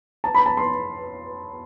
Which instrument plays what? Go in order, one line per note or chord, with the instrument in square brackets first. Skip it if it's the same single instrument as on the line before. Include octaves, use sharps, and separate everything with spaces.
[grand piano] A5
B5
A5
C6